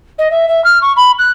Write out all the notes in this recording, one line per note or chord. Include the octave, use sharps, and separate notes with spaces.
D#5
E5
E5
F6
C#6
B5
F#6